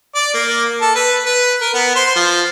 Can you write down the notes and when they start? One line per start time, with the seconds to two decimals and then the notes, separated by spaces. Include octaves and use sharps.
0.15 D5
0.34 A#3
0.82 A4
0.95 B4
1.26 B4
1.61 A#4
1.74 B3
1.96 C5
2.16 F3